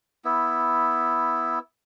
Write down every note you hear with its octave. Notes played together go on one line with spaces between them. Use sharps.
B3 E4